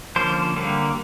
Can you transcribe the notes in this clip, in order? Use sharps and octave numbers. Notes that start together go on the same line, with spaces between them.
D3 F3 A#3 C#4 C5
D3 G3 A#3